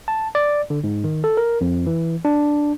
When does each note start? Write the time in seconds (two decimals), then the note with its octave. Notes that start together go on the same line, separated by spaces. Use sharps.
0.08 A5
0.35 D5
0.70 D3
0.84 G#2
1.04 D#3
1.24 A4
1.37 A#4
1.61 F2
1.86 E3
2.25 D4